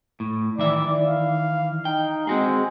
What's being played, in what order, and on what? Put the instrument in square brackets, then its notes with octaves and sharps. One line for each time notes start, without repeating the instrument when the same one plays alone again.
[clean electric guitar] A2
[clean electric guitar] D#3 E3 E5 [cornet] D5
[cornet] F5
[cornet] D#4 [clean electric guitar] G5
[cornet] G#3 [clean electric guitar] C4 F#4 G#4